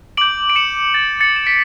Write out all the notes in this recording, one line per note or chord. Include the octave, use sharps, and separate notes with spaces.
D6 G6 D7 F#7
D7
C#7 E7
D6 G6 A6
A6 C#7
E7
B6 D7